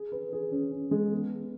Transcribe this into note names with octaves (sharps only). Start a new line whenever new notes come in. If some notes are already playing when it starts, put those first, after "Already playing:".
Already playing: G#4
B4
G#4
C#4
C#4
G#3
B3